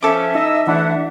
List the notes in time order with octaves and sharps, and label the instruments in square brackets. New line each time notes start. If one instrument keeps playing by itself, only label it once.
[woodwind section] F3 C#4 [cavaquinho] A4 D6 [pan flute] E5
[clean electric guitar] D#4 [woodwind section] D#5 E6
[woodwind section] D2 A3 F#5 [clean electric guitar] E3 D4